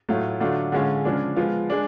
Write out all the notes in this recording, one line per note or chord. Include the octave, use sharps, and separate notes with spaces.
A2 F#3 A3 F4
D3 F#3 A3 D4 F4
D3 G#3 C#4 F4
C#3 F3 G#3 D4
F3 G#3 B3 F4
G#3 D4